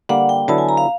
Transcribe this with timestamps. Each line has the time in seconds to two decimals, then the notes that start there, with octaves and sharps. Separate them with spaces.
0.09 D3 G3 A#3 F#5
0.29 G5
0.48 D3 F#3 B3 E4 A5
0.58 G#5
0.69 A#5
0.77 F5